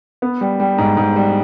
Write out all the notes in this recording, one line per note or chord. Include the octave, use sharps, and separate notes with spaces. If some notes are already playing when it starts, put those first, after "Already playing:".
B3
G3
G3
G#2
G#2
G3